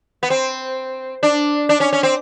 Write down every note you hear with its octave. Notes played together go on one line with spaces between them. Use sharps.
B3
C4
D4
D4
C#4
C#4
C4